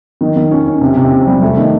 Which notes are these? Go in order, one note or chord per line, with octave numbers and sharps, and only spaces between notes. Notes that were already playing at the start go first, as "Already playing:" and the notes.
D#3
D#3
C#4
C#4
C3
C3
C3
G3
A3
D#3